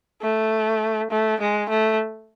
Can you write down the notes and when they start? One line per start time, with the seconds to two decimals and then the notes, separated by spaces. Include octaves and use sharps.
0.22 A3
1.11 A3
1.40 G#3
1.69 A3